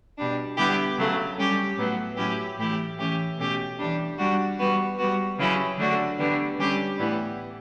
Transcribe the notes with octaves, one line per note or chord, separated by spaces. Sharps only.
B2 G3 D4
D3 G3 B3 E4 G4
C#3 F#3 A3
G3 C#4 G4
A2 F#3 B3
A2 F#3 C#4 E4 G4
A2 E3 A3 E4 G4
E3 A3 C#4 G4
B2 A3 C#4 G4
E3 G3 D4
G3 D4 F#4
G3 B3 F#4
G3 B3 F#4
C#3 F#3 C#4 E4 G4
D3 A3 D4 F#4
D3 G3 B3
D3 G3 C#4 G4
A2 E3 G3 B3